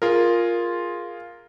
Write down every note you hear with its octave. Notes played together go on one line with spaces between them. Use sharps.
F4 G#4 A#4